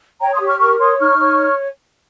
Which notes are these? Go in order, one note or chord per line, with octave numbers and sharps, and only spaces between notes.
C#5 G5 A#5
C6 D#6
G4
C#6 F6
A#4 C#6 F6
C#5 C6 D#6
D#4 C#6 F6
C#5